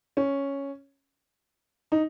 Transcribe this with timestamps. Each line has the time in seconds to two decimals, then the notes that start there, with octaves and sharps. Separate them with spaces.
0.17 C#4
1.92 D#4